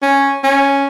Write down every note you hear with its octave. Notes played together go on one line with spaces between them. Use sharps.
C#4
C#4